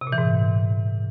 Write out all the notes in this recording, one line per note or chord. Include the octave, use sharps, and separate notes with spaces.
C3
A#2
E3
G#2